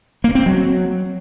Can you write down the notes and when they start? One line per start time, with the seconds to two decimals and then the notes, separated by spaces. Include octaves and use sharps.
0.24 A#3
0.35 C4
0.46 F#3